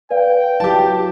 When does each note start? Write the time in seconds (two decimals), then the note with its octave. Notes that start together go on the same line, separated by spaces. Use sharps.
0.10 B4 D5 F5 G5
0.60 F#3 E4 G4 A5